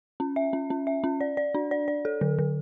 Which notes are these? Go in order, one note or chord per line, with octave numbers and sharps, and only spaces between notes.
C#4
E5
C#4
C#4
E5
C#4
D5
D5
D4
D5
D5
A4
D3
D3